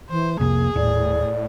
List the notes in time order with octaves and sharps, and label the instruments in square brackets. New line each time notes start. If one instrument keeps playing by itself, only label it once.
[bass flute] E3 [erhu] C5
[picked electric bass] C2 F2 C3 [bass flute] A#3 [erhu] G#4
[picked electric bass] D#1 [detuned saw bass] A2 [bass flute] D5